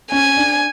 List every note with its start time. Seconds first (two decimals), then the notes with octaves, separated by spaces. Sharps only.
0.12 C#4 G#5
0.37 D4